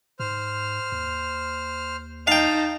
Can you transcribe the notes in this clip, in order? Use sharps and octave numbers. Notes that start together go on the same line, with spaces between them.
G#2 C5 F6
D#2
D#4 F5 G5 A5